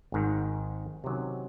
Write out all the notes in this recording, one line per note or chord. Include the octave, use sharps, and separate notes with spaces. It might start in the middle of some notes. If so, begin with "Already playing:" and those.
G#1 G#2 D#3
C3 D#3 F#3 C#4